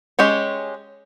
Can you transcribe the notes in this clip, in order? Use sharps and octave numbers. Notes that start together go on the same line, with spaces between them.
G#3 C#4 G4 C#5